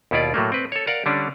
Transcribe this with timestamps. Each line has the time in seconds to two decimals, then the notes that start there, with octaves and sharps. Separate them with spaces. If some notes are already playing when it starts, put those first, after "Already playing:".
0.11 D#2 B2 E4 F4 D5
0.34 A2 F#3 A3 A#3
0.52 C4 B4
0.72 A4 C#5
0.87 A#4 D5 F5 F#5
1.06 D3 G3 C#4 D4